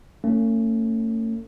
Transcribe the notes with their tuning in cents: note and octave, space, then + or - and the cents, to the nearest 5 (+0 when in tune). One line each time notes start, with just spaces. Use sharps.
A3 +40 C#4 +0